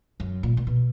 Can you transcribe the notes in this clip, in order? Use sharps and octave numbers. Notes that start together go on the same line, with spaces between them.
F#2
A#2
A#2
B2